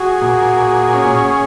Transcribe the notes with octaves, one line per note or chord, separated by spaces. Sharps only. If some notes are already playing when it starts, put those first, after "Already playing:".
Already playing: F#4 G#4
A#2
G#4
C#4
G#4